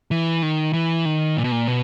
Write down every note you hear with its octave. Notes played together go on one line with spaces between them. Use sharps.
E3
D#3
E3
D#3
A#2
B2
A#2
B2